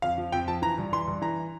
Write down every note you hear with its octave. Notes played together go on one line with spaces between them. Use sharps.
F2 F5
F3
F2 G5
F3 A5
E3 A#5
G2
E3 C6
G2
E3 A#5